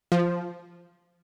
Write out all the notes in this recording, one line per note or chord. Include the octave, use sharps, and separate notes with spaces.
F3